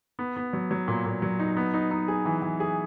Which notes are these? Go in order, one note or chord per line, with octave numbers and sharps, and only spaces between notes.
B3
B3
F#3
F#3
A#2
A#2
F#3
D#4
B3
D#4
D#4
G#4
E3
E3
G#4